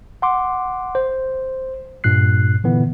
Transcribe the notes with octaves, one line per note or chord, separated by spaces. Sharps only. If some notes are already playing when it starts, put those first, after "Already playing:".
F#5 C6 D6
C5
G2 A#2 F#6 C7
A#2 D3 E3 B3